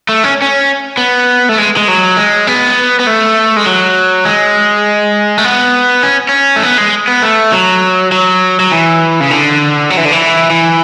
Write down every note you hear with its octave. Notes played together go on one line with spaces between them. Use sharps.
A3
C#4
C#4
B3
A3
G#3
G#3
F#3
G#3
B3
B3
A3
G#3
F#3
G#3
A3
B3
C#4
C#4
A3
B3
G#3
B3
A3
F#3
F#3
F#3
E3
C#3
D3
F#3
E3
D3
E3
E3